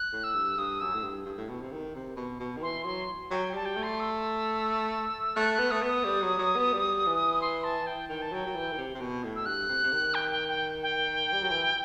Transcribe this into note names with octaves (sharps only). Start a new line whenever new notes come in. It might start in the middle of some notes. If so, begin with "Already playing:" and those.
Already playing: F#6
A2
E6
G2
G2 D#6
F#2 E6
A2
G2
G2
A2
B2
C3
D#3
C3
B2
B2
D#3
E3 C6
F#3 C6
F#3 G5
G3 A5
G5
A3
C6
E6
A3 F#6
F#6
B3
A3 D#6
B3
D#6
G3
F#3
F#3
B3
G3
E3
C6
A5
G5
D#3 G5
A5
F#3 G5
F#3
E3
D#3
C3
C3
B2
A2
E6
G2 F#6
C3
C3
D#3
G5
G5
G5
G5
G3
F#3
E3